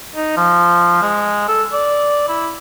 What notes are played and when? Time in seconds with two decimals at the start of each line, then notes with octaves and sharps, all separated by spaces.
0.15 D#4
0.37 F3
1.02 G#3
1.48 A4
1.73 D5
2.28 E4